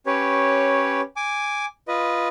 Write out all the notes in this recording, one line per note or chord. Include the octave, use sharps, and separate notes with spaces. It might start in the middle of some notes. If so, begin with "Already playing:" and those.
C#4 G4 B4 C#5
G#5 D6
F4 B4 D#5